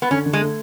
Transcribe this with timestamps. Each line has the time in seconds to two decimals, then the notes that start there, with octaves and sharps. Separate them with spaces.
0.02 B3
0.11 D3 C#4
0.26 D3
0.33 G#3
0.41 A3